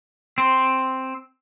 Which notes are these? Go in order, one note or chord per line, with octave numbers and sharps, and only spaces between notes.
C4